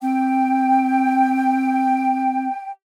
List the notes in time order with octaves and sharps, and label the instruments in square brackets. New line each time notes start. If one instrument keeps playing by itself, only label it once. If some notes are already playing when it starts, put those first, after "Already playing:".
[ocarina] C4 [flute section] G5